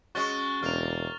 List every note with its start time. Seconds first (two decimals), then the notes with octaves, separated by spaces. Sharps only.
0.15 G#3 C#4 F#4 C#6 A6 G7
0.63 E1 A#3 F6 F7